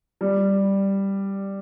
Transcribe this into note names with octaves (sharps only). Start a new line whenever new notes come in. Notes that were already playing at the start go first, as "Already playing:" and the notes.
G3